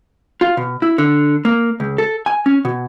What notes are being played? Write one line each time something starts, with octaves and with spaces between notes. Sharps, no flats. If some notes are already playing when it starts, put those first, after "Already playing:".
F4
B2
E4
D3
A#3
C#2
A4
G#5
C#4
B2